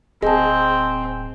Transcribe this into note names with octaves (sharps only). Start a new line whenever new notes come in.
D1 C4 G#4 D#5 A5